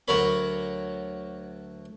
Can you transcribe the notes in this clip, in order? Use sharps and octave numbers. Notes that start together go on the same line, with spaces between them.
D2 F#3 A#4 C#5 B5